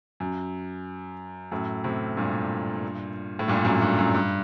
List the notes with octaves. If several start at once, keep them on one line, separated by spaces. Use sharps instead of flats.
F#2
F#2 A2
A2 C3
G2 A#2
A2
G2 A#2
F#2 A2
G2
F#2
G2